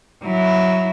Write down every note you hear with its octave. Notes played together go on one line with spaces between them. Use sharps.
F#3 E4